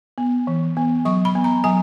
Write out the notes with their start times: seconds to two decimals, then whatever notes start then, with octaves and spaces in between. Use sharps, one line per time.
0.18 B3
0.47 E3
0.77 B3
1.05 F#3 C#6
1.25 B5
1.35 B3
1.44 A#5
1.64 F#3 G#5